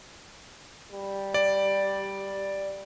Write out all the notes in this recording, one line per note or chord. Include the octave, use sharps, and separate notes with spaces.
G3
D5